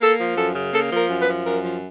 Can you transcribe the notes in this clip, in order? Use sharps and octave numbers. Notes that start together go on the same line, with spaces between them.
A#3 A4
F3
F#2 A4
C#3
A#3 A4
F3
A#4
F#2
B4
F3
F#2 A#4
F3